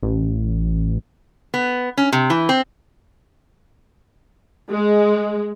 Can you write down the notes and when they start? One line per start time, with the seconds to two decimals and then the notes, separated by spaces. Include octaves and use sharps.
0.03 A1
1.54 B3
1.97 C#4
2.12 C3
2.30 E3
2.49 C4
4.70 G#3